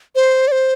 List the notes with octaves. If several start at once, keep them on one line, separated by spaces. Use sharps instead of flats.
C5
D5
C5